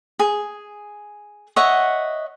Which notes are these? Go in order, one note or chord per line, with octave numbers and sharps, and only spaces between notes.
G#4
C#5 D#5 E5 F#5